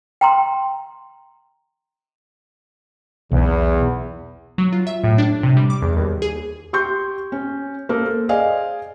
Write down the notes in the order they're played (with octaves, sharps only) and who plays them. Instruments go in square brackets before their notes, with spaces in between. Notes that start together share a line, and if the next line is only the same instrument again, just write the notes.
[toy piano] G5 A#5 C6
[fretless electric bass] B1 [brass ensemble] E2
[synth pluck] F#3
F4
E5
A2
D4
C3
G3
D6
E2
D#2
G#4
[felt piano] G4 C6 C#6 G6
C#4
A#3 A4
C5
G#4 C5 D5 D#5 F5 G#5